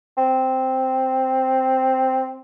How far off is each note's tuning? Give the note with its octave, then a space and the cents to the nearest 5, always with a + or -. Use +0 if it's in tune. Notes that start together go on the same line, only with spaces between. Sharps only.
C4 +0